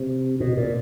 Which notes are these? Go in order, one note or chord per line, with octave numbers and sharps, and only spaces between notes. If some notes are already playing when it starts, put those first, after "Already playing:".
Already playing: C3
B2
A#2